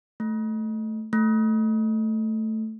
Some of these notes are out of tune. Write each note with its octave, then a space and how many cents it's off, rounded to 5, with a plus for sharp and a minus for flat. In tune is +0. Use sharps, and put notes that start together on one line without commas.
A3 -5
A3 +0